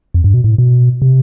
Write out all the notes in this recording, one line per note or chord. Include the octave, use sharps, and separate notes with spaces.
F2
G2
B2
A2
B2
C3